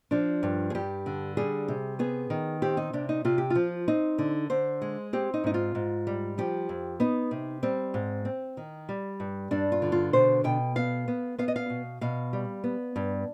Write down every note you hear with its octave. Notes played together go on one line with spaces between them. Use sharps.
F3 D4
G2
G#4
G2 G4
D3
G3 G#4
C3
B3 G#4
D#3
C4 G4
D#4
C3 D4
D#4
C3 F4
G4
F3 F4
C4 D#4
D3
D3 C5
G#3
C4 G4
D#4
G#2 D#4
F4
G#2
G3
F3 G4
F2
B3 D#4
C3
G3 C4
G#2
C4
D#3
G3
G2
G2 D4
F4
D3
F4
B2 C5
B2 G5
B3 F5
B3
B3 F5
D#5
F5
B2
B2 F5
G3
B3
G2